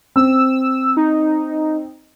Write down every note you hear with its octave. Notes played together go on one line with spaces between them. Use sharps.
C4 E6
D#4